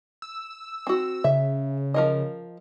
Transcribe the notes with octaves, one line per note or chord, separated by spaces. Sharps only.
E6
C4 F#4
C#3 E5
F3 A#4 D#5